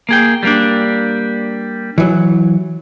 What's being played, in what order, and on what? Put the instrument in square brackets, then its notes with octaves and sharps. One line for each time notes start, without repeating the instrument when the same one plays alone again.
[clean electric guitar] A#3 G#4 G5
G3 A#3 D4
[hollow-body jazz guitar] E3 F#3